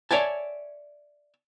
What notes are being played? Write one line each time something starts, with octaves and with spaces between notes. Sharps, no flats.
C#5 D5 E5 G#5 A5